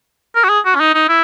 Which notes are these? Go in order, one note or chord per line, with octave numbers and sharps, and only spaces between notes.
A#4
F#4
G#4
F#4
C#4
D#4
D#4
E4